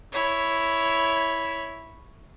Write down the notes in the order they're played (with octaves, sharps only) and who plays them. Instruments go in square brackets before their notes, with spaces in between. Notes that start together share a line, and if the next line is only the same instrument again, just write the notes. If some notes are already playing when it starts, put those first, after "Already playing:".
[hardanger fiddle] E4 C#5